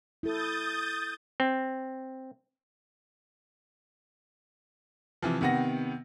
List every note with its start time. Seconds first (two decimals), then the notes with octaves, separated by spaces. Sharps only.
0.23 E4 A4 D#6 G6 A6
1.40 C4
5.22 C3 E3 F3
5.41 C3 D#3 B3 F#5 A#6